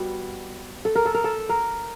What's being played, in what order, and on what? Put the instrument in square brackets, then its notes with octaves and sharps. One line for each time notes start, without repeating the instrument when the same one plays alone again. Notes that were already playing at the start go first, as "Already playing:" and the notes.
Already playing: [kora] G3 B3 F#4
A4
A#4
A4
A#4
A4
A#4